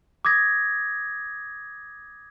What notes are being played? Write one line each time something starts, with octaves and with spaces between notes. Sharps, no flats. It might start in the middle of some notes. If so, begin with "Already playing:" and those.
D6 D#6 G#6 A#6